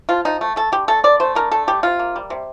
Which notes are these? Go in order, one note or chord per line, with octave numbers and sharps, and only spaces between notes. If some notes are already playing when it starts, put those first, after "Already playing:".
F3 F4
F3 D#4
A3
A3 A4
D3 G4
A3 A4
D3 D5
A3 C5
D3 A#4
A3 A4
G3 G4
C3 F4
A#3
G3
C3